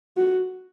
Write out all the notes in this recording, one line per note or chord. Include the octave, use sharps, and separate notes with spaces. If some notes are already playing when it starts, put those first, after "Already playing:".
F#4